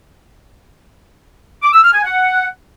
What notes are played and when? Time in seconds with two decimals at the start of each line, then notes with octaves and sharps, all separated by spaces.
1.63 D6
1.73 E6
1.83 F6
1.93 G#5
2.04 F#5